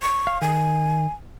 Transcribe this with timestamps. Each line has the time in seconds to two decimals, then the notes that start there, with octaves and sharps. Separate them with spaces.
0.02 C#6
0.27 F5
0.42 D#3 G#5